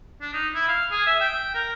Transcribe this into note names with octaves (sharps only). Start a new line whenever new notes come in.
D4
D#4
E4
F5
G#4
E5
G5
A#4